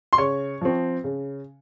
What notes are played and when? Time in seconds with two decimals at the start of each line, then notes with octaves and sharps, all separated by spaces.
0.13 C6
0.18 C#3 C#5 C#6
0.61 F3 C4
1.04 C#3